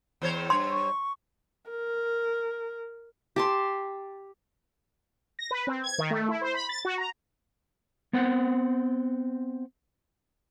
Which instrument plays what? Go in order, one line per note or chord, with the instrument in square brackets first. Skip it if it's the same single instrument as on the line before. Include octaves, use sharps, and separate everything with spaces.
[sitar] E2 C5 C#5
[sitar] G2 C#5 [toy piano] C6
[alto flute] C#6
[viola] A#4
[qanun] G4 A5 C6
[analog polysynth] A#6
B4
C4
G#6
D#3
A3
E4
C5
B5
A6
F#4
A#5
[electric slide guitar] B3 C4 C5 F#5